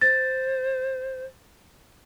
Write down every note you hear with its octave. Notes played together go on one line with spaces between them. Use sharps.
C5 A6